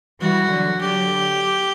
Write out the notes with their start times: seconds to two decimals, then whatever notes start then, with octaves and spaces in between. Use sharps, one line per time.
0.21 E3 G3 F#4
0.51 D3 F#3
0.81 D3 F#3 G4